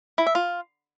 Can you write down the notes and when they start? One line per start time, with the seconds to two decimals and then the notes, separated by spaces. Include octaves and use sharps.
0.18 E4
0.27 E5
0.35 F4